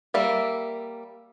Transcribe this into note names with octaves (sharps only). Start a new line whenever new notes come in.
G3 A#3 E5